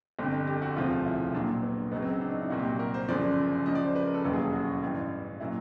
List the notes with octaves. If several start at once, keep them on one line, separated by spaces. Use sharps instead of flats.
G1 F2 D3 G4
G4
F#4
E1 D2 C3 F3 F4
E4
A#1 A#2 F#3 D4
B3
C#2 C#3 F#3 B3
C4
C#4
D4
D#4
E4
C2 A#2 F#3 F#4
G4
F#4
A#4
C5
G1 F#2 C#3 F3 D5
C#2 C#3 F3 D#5
D5
C5
B4
A#4
A4
E1 D#2 C#3 F#3 A4
G#4
F#4
A1 G2 E3
A#2 F#3 E4